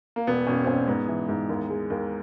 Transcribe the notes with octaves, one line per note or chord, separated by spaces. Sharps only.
A#3
E1 B3
E1 C#4
C4
E1 C#4
G#2 B3
E3
G#2
D#2
G#3
D#2